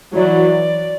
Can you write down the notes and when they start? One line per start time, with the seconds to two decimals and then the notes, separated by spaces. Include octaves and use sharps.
0.14 E3 F#3 D5